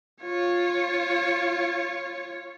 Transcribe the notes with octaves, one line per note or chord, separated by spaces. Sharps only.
F4 C#5